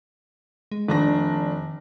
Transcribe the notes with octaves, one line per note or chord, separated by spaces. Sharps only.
G#3
F1 D#3 D4 A#6